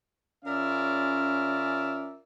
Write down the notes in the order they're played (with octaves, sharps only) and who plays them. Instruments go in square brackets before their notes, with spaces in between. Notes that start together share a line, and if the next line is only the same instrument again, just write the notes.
[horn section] C#3 C#4 F4 A#4 D5 E5